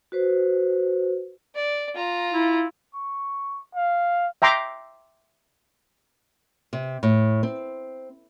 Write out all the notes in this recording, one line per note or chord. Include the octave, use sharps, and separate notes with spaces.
F#4 B4 C5
D5
F4 A#5
E4
C#6
F5
E5 G5 A#5 C6 D6
C3
A2
C4